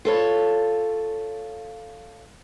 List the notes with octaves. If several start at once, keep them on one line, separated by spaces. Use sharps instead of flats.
F4 A4 C#5